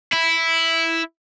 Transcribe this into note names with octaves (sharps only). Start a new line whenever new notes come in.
E4